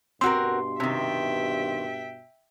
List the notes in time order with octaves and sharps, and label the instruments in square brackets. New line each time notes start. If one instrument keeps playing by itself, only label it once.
[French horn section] G2 B2 [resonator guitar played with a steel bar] C4 F#4 A#4 [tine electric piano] C6
[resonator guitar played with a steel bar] C3 D#3 [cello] E5 G5